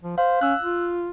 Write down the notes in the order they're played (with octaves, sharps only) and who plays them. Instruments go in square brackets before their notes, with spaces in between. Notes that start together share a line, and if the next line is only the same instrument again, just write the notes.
[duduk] F3
[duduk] C5 [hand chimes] F5
[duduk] C#4 [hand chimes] E6 F#6
[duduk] F4